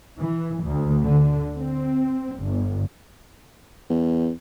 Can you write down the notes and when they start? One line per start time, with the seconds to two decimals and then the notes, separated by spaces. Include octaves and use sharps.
0.20 E3
0.64 D2
1.03 D3
1.56 C4
2.39 G1
3.90 E2